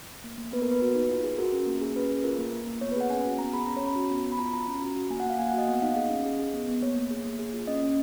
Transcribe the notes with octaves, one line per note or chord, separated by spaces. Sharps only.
A#3
A#3
B3 B4
A#4
B3 B4
F#4
D#4
F4
G#4
F#4 A#4
C#4
A#3
G#4
C#4 B4
G#4
F4 A#4
A#3
A#3
A#3
B3 C#5
B4
G#4 F#5
C#4 G#5
F#4
B3 A#5
G#4 B5
C#4 A#5
C#5
C#4 B5
F#4
B3
B3
B5
F4 A#5
B5
F4 A#5
C#4
F#4
F#4
A#3 G#5
F#5
A#3 F5
A#3 G#5
F#5
F#4 D#5
B3 F#5
D#4 F5
G#4 D#5
C#4
G#4
G#4
B3
B3
A#3 C#5
A#3
G#4
A#3
G#4
F4
C#4 D#5
C#4